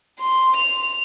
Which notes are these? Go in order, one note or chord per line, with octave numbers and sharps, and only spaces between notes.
C6
F7